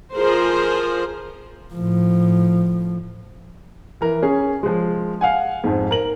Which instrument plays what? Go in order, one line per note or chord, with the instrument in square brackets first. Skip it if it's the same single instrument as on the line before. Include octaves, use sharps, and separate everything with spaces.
[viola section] F3 G#4 A#4 C5
[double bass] A2 F3
[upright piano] E3 A#4
C#4 G#4
F3 G#3
F5 F#5 G#5
F2 G#2
A#4 F#7